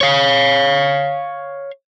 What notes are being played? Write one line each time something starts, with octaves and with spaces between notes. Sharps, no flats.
C#5 F5